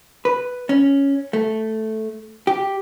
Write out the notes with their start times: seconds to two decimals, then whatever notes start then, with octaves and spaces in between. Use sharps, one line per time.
0.25 B4
0.69 C#4
1.33 A3
2.47 G4